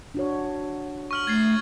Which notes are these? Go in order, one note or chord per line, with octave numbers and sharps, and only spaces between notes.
D4 F#4 C#5
C#6 F6 F#7
A3 G#6 A6 C7